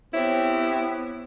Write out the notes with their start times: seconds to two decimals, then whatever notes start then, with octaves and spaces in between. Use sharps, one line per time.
0.14 B3 C4 E4 G4 C#5